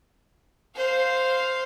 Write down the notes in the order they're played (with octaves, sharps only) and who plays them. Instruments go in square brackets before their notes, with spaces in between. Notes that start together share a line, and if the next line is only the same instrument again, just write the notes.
[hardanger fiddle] C5 F5